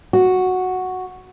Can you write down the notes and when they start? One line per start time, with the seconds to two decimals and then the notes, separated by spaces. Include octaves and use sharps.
0.13 F#4